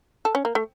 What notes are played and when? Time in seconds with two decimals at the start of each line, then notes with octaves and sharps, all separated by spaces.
0.25 A4
0.35 C#4
0.45 A#3
0.55 A3